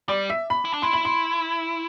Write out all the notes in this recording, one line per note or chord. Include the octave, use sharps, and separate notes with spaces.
G3 D5
E5
B5
E4
D4
E4 C6
B5
C6